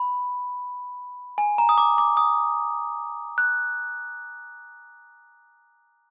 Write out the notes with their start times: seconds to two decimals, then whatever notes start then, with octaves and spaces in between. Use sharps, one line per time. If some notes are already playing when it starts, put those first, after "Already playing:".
Already playing: B5
1.38 G#5
1.58 A#5
1.69 D#6
1.78 D6
1.98 D6
2.17 D#6
3.38 F#6